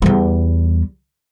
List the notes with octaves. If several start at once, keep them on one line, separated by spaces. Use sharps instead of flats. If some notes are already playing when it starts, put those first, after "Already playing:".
E2 G3